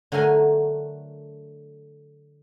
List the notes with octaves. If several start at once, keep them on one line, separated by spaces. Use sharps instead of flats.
D3 F#3 A3 A#4 G#5